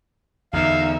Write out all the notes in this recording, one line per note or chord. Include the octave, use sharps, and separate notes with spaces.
E2 D3 D#4 E5 F5